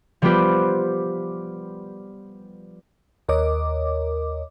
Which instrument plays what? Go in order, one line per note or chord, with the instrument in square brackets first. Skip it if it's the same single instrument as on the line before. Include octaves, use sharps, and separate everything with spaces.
[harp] F3 G3 B3 F4 G4 B4
[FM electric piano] D#2 A#4 C#5 D#5 D6